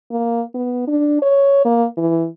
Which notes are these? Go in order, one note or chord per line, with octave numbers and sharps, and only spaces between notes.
A#3
B3
D4
C#5
A#3
E3